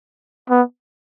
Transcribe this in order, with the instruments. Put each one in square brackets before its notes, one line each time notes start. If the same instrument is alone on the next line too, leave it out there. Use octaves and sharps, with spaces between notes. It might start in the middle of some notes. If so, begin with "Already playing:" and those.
[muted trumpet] B3